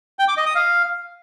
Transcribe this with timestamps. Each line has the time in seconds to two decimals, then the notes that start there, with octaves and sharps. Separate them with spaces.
0.19 G5
0.28 D6
0.37 D#5
0.46 D#6
0.55 F5